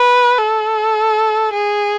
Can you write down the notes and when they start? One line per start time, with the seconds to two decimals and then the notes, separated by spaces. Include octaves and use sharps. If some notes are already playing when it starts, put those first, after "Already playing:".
Already playing: B4
0.38 A4
1.53 G#4